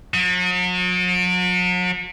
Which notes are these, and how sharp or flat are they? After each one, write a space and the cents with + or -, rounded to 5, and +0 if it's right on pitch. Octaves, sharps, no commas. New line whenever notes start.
F#3 -40